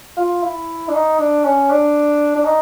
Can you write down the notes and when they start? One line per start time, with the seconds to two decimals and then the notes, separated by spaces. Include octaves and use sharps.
0.17 F4
0.43 E4
0.88 D4
0.94 D#4
1.19 D4
1.44 C#4
1.70 D4
2.36 D4
2.45 D#4